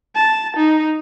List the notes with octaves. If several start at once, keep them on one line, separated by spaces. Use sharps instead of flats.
A5
D#4